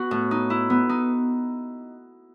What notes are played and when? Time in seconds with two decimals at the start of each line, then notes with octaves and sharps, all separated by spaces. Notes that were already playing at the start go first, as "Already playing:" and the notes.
Already playing: B3 F#4
0.11 A2
0.31 D#4
0.50 E4
0.70 B3
0.89 D#4